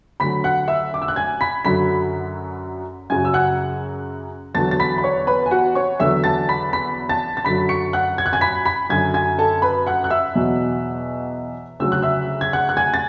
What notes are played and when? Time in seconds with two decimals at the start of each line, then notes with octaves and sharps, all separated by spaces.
0.20 D2 D3 F#3 B5 B6
0.44 F#5 F#6
0.68 E5 E6
0.94 D6
1.02 E6
1.08 F#6
1.16 G#5 G#6
1.41 B5 B6
1.65 F#2 D3 F#3 B5 B6
3.10 F#2 C#3 F#3 G#5 G#6
3.25 E6
3.34 F#5 F#6
4.54 E2 D3 F#3 A5 A6
4.71 A6
4.80 B5 B6
4.98 B5
5.04 C#5 C#6
5.27 B4 B5
5.46 G#5
5.51 F#4 F#5
5.75 C#5 C#6
6.00 E2 D3 F#3 E5 E6
6.24 A5 A6
6.49 B5 B6
6.73 B5 B6
7.09 A5 A6
7.37 A6
7.45 F#2 D3 F#3 B5 B6
7.69 C#6 C#7
7.93 F#5 F#6
8.18 G#6
8.26 F#6
8.33 G#5 G#6
8.41 B5 B6
8.65 B5 B6
8.90 F#2 D3 F#3 G#5 G#6
9.14 G#5 G#6
9.38 A4 A5
9.62 B4 B5
9.87 F#5 F#6
10.04 F#6
10.10 E5 E6
10.35 E2 B2 F#3
11.80 D2 C#3 F#3 E6
11.92 F#6
12.02 E5 E6
12.41 G#6
12.53 F#5 F#6
12.69 F#6
12.77 G#5 G#6
12.94 A6